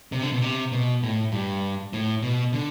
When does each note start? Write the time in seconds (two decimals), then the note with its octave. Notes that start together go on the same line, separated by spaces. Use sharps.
0.12 C3
0.22 D3
0.33 B2
0.42 C3
0.72 B2
1.03 A2
1.32 G2
1.93 A2
2.23 B2
2.53 D3